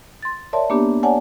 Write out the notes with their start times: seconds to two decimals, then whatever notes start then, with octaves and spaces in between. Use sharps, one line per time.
0.23 C6 A6
0.53 A#4 C#5 D5 E5 A5 C6
0.70 A#3 B3 D4 G4
1.03 C#5 D5 F#5 G#5 A5